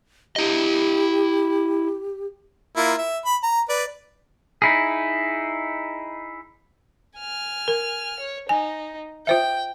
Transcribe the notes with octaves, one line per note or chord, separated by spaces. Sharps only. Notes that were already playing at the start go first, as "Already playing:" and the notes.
E4 G4 D#5
A#3 E4 F4
E5
B5
A#5
B4 D5
D#4 E4 G#4
G#5 F6
A#4
C#5
D#4 G#5
F4 C5 E5 G5